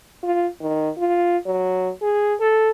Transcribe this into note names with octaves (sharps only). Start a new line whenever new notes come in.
F4
D#3
F4
F#3
G#4
A4